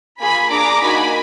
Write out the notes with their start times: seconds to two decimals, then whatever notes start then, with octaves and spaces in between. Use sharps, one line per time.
0.19 A#3 F4 G#4 G#5 B5
0.50 D4 G#4 A#5 D6
0.82 A#3 D#4 F#4 G#5 B5